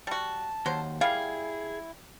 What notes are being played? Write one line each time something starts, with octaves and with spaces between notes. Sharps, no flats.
G3 F#4 A5
D#2 F#3 C5
G3 E4 G#4 F5